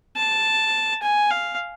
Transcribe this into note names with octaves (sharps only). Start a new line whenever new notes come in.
A5
G#5
F5